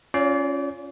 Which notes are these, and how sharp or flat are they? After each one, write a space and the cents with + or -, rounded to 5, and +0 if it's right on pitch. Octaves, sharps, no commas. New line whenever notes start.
C#4 +0 F4 +0 D5 -35